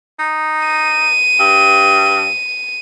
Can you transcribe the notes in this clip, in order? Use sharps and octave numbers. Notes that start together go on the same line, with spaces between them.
D#4
D#7
G2